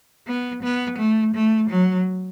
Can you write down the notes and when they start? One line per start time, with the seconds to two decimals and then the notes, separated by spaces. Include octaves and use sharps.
0.27 B3
0.63 B3
0.98 A3
1.35 A3
1.70 F#3